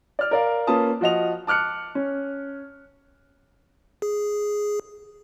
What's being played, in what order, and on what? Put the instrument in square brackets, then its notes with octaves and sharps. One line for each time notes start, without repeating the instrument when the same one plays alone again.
[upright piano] D5 F6
A#4 D5 F5
A#3 C#4 F4 B4 A5 D#6
F3 F#4 D#5 F7
A5 D6 F6 F#6 C#7
C#4
[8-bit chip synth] G#4